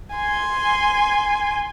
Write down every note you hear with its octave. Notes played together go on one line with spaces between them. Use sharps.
G#5 C6